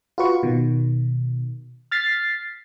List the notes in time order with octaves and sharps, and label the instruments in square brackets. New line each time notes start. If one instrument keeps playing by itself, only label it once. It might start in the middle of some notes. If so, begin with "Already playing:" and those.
[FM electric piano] F4 F#4 B4 C#6
B2 D#3
F6 A6 B6 C7